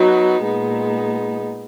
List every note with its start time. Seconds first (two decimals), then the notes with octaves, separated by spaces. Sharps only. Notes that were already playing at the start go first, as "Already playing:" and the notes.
Already playing: F#3 B3 D#4
0.43 A#2 G#3 B3 D#4